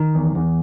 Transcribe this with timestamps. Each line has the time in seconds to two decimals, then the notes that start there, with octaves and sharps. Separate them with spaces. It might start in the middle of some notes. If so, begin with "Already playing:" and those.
Already playing: D#3
0.15 E2
0.35 E2